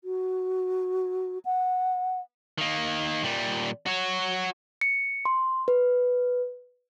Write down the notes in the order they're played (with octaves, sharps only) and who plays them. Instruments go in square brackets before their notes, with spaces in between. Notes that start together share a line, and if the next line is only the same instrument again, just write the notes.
[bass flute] F#4
F#5
[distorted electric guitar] D#3 A#3
A#2 G3
F#4 C#5
[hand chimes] C#7
C6
B4